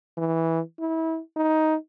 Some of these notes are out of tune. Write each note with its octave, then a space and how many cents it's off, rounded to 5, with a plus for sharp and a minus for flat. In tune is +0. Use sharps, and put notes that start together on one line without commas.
E3 -10
E4 -30
D#4 +10